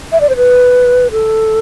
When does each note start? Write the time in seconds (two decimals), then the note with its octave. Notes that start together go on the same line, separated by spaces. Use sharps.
0.12 E5
0.20 D5
0.29 C5
0.36 B4
1.12 A4